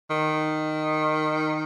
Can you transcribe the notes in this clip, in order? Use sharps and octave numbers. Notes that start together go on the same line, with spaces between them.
D#3